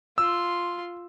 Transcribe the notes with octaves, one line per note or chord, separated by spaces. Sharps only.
F4 C6 E6